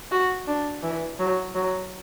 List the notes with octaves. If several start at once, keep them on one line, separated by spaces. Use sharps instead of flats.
F#4
D4
E3
F#3
F#3